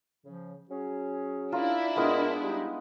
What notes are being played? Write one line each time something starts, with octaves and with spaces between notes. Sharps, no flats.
C#3 F3
F#3 C#4 G#4
D4 E4 F4 A#4
A#2 G#3 B3 A#4 D#5
G3 D#4